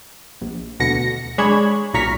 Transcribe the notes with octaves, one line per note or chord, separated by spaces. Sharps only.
A#1
D2 B2 D3 A#6 C#7
G#3 D4 G#4 C#5 B5 G#6
B1 A#2 A#5 C#6 F6 B6